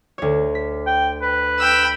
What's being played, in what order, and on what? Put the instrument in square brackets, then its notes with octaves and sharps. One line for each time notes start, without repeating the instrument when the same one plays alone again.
[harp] D2 C#5
B6
[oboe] G5
B4
[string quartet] G5 B5 E6